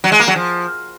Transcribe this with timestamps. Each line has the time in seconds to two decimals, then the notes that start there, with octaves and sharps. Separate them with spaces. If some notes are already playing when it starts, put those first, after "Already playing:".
0.04 F#3
0.12 G#3
0.20 A#3
0.28 F#3
0.36 F3